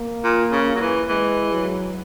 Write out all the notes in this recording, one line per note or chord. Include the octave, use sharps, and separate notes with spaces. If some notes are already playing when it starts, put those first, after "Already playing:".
Already playing: A#3
A#2
C#3
F#3
E3
E3 G#3
F#3